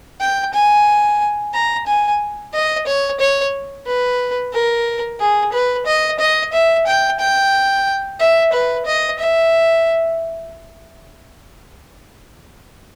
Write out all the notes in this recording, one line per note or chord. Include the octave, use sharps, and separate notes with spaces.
G5
G#5
A#5
G#5
D#5
C#5
C#5
B4
A#4
G#4
B4
D#5
D#5
E5
G5
G5
E5
B4
D#5
E5